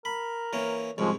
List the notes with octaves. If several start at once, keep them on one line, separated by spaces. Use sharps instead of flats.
A#4 B5
E3 A#3 C#4
C2 G#2 F3 G#3 C#4